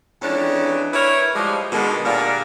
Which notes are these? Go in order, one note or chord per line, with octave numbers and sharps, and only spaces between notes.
F2 E3 G#3 C#4 D4
E4 A#4 B4 C#5
A2 F3 G3 G#3
B2 D3 D#3 G#3
A#2 D3 G3 A#4 D5 F5